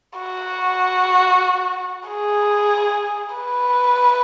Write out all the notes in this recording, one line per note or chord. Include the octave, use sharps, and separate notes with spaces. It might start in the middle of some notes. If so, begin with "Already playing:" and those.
F#4
G#4
B4